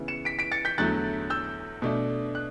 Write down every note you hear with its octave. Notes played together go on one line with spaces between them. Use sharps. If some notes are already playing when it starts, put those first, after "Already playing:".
Already playing: C#3 E3 B3 E4
C#7 E7
B6 D7
B6 D7
A6 C#7
G6 B6
E2 D3 F#3 A3 E4 F#6 A6
E6 G6
B2 A3 D4
F#6